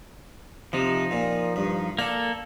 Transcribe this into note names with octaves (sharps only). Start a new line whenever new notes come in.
C3 F3 D#4
A#2
G2
A#3 A4 D5